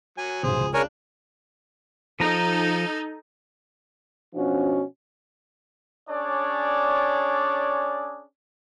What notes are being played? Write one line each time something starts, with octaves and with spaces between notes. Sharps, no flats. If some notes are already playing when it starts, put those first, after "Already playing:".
F#3 G#5
F1 B1 G#4 C5
C#2
C#3 D4 A#4 C#5 G#5
F3 D#4 A4 A#5
B2 F3 C#4 D4 F#4
C#4 D4 G#4 C#5 D5